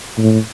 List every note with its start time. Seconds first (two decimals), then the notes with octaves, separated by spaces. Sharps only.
0.18 A2